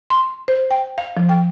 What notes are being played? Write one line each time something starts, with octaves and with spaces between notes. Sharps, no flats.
C6
C5
G5
F5
F3
G5